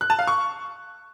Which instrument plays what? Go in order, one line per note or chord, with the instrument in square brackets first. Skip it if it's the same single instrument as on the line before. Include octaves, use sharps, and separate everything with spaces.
[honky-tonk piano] F#6
A5
F5
C#6